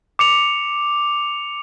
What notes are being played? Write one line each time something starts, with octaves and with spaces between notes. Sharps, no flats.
D6 C#7 F7